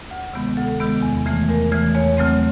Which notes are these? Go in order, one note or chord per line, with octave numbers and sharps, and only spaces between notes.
D2
C3 D#3 G#3 B3
D2 A4
C3 D#3 G#3 B3
E2
C#3 E3 A3
E2 A#4
C#3 E3 A3
E2 C#5
C#3 F#3 A3 C4